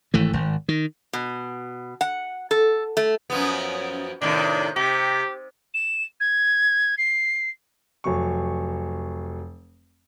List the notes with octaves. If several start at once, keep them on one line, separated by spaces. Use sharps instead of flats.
G#1 E3 A3
G#1
D#3
B2
F#5
A4
A3
F#2 F3 B3
A2 C3 D#3 D4
C3 G4
E7
G#6
C7
F1 F#3 C#6